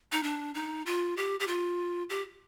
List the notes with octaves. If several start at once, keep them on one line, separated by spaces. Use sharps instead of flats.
D#4
D4
D#4
F4
G4
G4
F4
G4